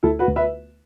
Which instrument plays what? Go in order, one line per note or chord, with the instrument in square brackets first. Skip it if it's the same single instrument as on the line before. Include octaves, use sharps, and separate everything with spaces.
[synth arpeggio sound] D2 [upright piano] E4 A4
[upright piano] F#4 B4
[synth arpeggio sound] D2
[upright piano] B4 E5